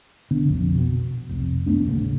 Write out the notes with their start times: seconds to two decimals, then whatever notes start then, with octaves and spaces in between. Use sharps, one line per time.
0.31 D3 B3 D4
0.48 A#1 F2
0.75 B2
1.29 F1 C2
1.66 F#1 A3 B3 D4
1.85 D#1 A1 C#3 A#3